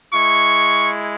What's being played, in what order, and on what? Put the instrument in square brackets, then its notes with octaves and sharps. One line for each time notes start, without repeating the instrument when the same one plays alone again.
[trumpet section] G#3 E4 C#6